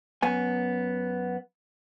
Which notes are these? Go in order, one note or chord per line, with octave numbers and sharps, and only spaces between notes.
F#2 B3 G#5